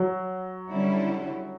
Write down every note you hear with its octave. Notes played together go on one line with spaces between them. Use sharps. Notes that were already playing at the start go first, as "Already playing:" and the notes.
Already playing: F#3
D3 G3 C#4 E4